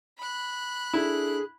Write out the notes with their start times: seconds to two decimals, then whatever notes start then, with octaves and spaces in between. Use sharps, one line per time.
0.18 B5 F#6
0.94 D4 E4 G#4 A4